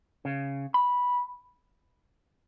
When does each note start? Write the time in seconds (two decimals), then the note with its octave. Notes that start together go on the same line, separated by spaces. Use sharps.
0.25 C#3
0.74 B5